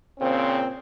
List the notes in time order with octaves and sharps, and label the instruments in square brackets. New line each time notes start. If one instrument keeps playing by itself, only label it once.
[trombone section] A#2 C#3 C4